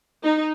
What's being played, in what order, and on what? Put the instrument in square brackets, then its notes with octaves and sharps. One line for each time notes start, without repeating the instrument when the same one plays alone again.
[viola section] D#4